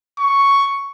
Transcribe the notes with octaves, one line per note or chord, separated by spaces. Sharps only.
C#6